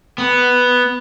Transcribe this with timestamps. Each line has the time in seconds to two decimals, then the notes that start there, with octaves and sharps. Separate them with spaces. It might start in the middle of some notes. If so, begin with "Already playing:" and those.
0.18 B3